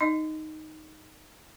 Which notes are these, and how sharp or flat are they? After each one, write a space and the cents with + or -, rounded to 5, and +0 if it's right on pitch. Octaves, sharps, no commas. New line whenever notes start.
D#4 +0 D#5 +0